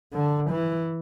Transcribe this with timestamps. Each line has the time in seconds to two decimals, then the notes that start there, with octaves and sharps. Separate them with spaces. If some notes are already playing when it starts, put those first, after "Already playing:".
0.13 D3
0.51 E3